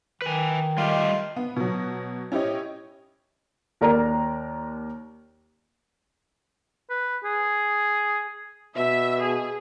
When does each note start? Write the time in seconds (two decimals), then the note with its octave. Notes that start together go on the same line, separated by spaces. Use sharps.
0.22 D#3 B4 G#5
0.78 G3 A3 F4 G4 D#5
1.36 B3
1.56 B2 F#3
2.32 C#4 E4 G4 C#5 D#5
3.81 D#2 A#4 D5 A#5
6.90 B4
7.24 G#4
8.76 B2 E5
9.22 G#4